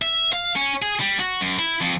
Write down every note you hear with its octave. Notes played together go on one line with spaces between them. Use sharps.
E5
F5
C#4
G#4
G3
F#4
F#2
E4
F2